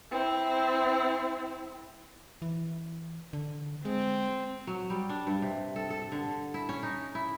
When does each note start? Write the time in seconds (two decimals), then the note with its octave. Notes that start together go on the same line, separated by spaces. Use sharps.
0.11 C4 E4
2.42 E3
3.33 D3
3.85 G#3 C4
4.67 F#3
4.90 G3
5.09 D4
5.27 G2
5.42 C3
5.76 A4
5.90 A4
6.12 D3
6.54 E4
6.69 C#4
6.83 D#4
7.15 E4